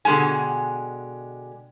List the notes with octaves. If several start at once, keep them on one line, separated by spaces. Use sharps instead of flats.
B2 D3 G#3 G4 G#5